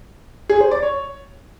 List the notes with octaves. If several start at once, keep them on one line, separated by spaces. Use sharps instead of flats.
G#4
C5
D5
C#5